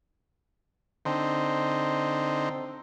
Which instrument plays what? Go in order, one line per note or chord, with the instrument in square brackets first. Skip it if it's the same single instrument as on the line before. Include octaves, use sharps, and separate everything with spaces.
[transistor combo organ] D3 C4 D#4